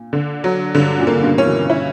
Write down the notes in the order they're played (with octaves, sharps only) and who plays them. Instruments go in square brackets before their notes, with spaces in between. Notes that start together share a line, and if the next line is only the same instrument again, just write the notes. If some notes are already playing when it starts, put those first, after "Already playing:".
Already playing: [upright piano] A#2
[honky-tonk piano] D3
F#3
[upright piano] G2 [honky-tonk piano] D3
[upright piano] F#2 A#2
[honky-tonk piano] A#3
[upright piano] C#3
G2 B2
[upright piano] E3 [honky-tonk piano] C#4
[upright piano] B2 D3
[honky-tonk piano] E4